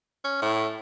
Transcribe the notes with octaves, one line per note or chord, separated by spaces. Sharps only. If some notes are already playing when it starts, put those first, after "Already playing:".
C#4
A2